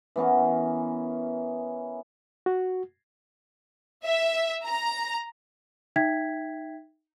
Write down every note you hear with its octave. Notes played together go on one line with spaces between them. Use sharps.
E3 B3 C#4 A#4
F#4
E5
A#5
D#4 E5 G5 G#6 B6